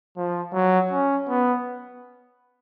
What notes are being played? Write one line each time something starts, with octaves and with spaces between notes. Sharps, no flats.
F3
F#3
C#4
B3